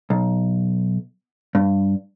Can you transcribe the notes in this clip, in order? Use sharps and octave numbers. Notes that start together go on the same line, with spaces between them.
B1
G2